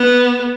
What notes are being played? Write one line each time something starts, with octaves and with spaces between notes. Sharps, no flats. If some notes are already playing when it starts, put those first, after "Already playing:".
Already playing: B3